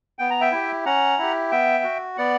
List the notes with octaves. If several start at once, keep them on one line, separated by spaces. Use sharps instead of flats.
B3 G5
A#5
E5 G5
E4 G4
C#4 F#5 A#5
E4 G4
B3 E5 G5
F#4
B3 D5 F#5